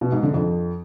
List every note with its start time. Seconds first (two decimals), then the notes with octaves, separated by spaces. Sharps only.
0.01 B2
0.12 G#2
0.23 D3
0.34 F2